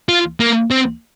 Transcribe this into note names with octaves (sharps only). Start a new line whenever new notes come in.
F4
A#3
C4